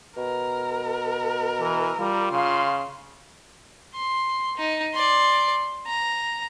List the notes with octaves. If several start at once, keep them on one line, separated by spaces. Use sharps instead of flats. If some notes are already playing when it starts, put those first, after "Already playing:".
B2 A#4
E3
G3 F4
C#3 F5 C6
C6
D#4
D5 C6
A#5